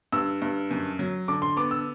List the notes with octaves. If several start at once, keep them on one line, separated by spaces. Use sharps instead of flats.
G2 E6
G2
F#2
F#3
D3 D6
C6
B3 D6
E6